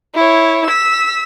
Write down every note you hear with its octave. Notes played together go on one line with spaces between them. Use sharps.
E4 C#5
E6 B6